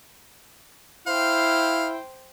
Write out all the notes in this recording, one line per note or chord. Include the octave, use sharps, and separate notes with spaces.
E4 C5 F5 G5